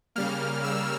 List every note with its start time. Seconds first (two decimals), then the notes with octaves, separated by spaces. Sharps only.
0.16 C#3 G3 A#3 F6
0.64 E6